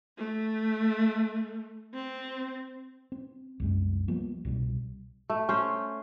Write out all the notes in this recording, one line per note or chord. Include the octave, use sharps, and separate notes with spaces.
A3
C4
C4
C2 F#2 G#3
F3 G3 A#3 B3
C2 B2 F3 G3
A3
C#4 C5